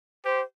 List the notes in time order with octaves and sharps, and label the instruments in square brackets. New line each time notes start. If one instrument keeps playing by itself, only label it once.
[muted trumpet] G4 [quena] C5